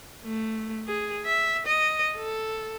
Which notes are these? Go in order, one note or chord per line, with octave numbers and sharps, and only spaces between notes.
A3
G#4
E5
D#5
A4